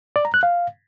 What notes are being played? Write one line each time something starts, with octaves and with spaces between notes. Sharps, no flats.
D5
A#5
F#6
F5